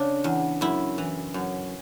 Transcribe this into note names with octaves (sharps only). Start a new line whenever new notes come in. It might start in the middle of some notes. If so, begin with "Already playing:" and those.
Already playing: C#3 D4
E2
F#2 E4
E3
F#2